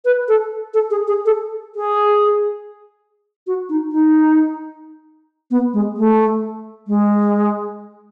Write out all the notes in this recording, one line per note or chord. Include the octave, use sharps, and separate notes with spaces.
B4
A4
A4
G#4
G#4
A4
G#4
F#4
D#4
D#4
B3
G#3
A3
G#3